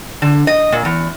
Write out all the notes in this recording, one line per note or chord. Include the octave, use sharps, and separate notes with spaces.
D3
D#5
A#2
E2